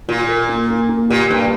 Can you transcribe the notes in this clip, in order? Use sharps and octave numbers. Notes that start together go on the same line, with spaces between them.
A#2 F4
A#4
A#3
A#3
A#3
A#2 G4
G2 A#3